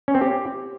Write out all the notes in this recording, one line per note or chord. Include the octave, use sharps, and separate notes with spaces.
C#4
C4
G4